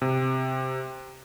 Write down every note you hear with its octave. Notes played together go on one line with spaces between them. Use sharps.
C3